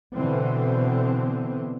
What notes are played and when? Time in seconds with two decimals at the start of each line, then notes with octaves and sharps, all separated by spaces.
0.15 B2 D3 E3 C4